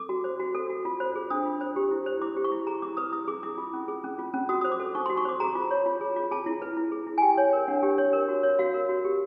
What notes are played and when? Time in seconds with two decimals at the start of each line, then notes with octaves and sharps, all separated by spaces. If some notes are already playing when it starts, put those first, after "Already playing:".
Already playing: A4 D6
0.09 F#4
0.24 C5
0.40 F#4
0.55 A4
0.70 F#4
0.85 F4
1.00 C5
1.16 G#4
1.30 D4 D#6
1.46 F4
1.61 C5
1.76 G4
1.91 E4
2.06 C5
2.21 E4 D6
2.37 G4
2.44 C#6
2.52 E4
2.67 G#4 A#5
2.82 E4 D6
2.97 B4 D#6
3.12 E4 D#6
3.28 G#4 D6
3.43 E4 D6
3.58 F4
3.73 C#4
3.88 G#4
4.04 C#4
4.19 F4
4.34 C#4
4.49 F#4 D#6
4.61 C5 D#6
4.72 D6
4.80 A4
4.95 D#4 C#6
5.06 F#4 C6
5.17 C#6
5.25 C5 D6
5.40 G#4 A#5
5.55 F4
5.71 C#5
5.86 F4
6.01 G#4
6.16 F4
6.31 G#4 A5
6.46 E4
6.62 B4
6.77 E4
6.92 G#4
7.07 E4
7.18 G#5
7.22 G4 G5
7.37 C#5
7.53 A#4
7.68 D4 F#5
7.83 G4
7.98 C#5
8.13 A#4
8.28 F#4
8.43 C#5
8.59 F#4 F5
8.74 A#4
8.89 F#4
9.05 G4